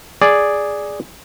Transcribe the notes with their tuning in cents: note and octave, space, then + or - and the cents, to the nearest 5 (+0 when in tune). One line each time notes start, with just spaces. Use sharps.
G#4 +0 D5 +0